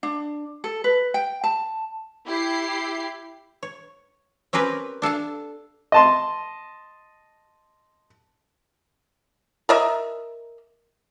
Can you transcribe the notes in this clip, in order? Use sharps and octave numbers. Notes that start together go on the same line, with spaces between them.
D4
A4
B4
G5
A5
E4 G4 C7
C#5
C4 C#4 G4 A#4 B4
D4 A4 F5 A5
D#5 A5 C6
A#4 D#5 E5